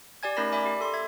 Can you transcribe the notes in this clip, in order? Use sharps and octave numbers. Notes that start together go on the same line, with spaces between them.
G4 D5 G#5 G#6
A3 C#4 D#4 A#4 B5 A#6
D5 E5 G#5 B5 D6
G4
A4 C6
E5 G#6